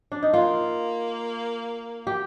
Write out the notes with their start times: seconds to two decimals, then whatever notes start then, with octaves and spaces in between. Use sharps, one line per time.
0.12 D4
0.23 D#4
0.33 A#3 F4
2.07 G4